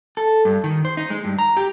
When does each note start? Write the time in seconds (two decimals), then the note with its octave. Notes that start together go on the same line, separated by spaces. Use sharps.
0.17 A4
0.45 G2
0.64 D#3
0.85 C5
0.97 D#4
1.10 G#3
1.25 G2
1.39 A#5
1.57 G4